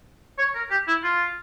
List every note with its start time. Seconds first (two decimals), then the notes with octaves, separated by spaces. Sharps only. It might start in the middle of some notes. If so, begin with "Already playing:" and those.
0.38 C#5
0.55 A#4
0.70 G4
0.87 E4
1.03 F4